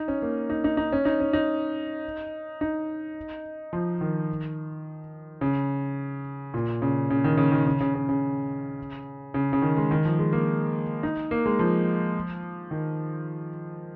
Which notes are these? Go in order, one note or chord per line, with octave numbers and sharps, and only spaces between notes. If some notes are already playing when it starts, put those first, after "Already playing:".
Already playing: D#4
C#4
A#3
D#4
D#4
D#4
C#4
D#4
C#4
D#4
D#4
F3
D#3
C#3
A#2
C#3
C#3
D#3
C#3
D#3
C#3
C#3
C#3
C#3
C#3
C#3
D#3
G#3
D#3
F3
G#3
A#3
D#4
A#3
G#3
F3
D#3